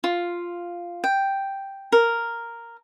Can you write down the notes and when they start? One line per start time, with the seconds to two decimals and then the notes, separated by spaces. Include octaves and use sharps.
0.04 F4
1.04 G5
1.92 A#4